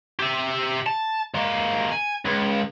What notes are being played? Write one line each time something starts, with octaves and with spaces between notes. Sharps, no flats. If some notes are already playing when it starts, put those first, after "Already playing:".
G4 E5
A5
G#3 A#3
G#5
C#2